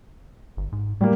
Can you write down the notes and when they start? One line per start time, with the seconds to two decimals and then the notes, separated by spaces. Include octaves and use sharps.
0.57 G1
0.72 G#2
1.01 A2 G3 A#3